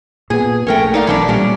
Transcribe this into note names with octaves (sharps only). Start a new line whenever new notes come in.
A#2 B3 G#4
A#1 A3 C#4 A#4 G5
D#4 D5 F5
B1 E3 C#4 D4
A#2 F3 G3 A3 C#4 D4